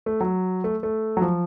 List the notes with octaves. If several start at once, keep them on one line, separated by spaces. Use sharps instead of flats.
A3
F#3
A3
A3
F#3
F3